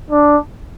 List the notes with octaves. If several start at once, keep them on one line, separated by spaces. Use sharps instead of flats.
D4